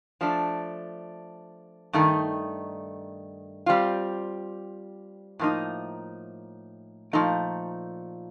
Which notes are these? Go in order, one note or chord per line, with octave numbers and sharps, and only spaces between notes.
F3 A3 D4
G2 D#3 A3 D#4
G3 C4 F4
A2 F3 A#3 D#4
A#2 F3 A3 D#4